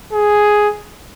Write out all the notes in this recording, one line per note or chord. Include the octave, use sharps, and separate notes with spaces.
G#4